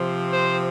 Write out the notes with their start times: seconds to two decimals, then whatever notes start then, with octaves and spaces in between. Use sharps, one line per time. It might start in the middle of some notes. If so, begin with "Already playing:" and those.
Already playing: C3 F3 C4
0.32 C5